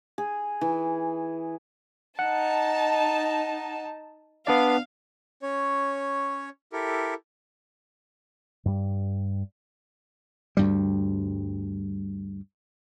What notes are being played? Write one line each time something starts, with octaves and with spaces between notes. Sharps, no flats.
G#4
E3
D#4 F#5 A5
B3 D4 D5 F5
C#4 C#5
E4 G4 A4 A#4
G2 G3
D2 G2 G3